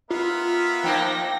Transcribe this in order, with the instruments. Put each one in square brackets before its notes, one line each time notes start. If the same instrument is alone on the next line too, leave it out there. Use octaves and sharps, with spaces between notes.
[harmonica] B3 A#4 E5 [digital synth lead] F4
[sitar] F3 A#3 D#4 [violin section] G5 A#6